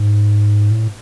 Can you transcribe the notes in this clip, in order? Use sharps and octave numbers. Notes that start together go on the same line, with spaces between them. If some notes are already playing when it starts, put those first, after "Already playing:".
Already playing: G#2
A2